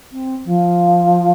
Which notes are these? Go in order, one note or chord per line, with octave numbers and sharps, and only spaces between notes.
C4
F3